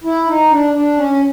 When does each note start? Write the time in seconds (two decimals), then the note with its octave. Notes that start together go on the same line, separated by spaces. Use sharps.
0.04 E4
0.27 D#4
0.51 D4
0.74 D4
0.97 C#4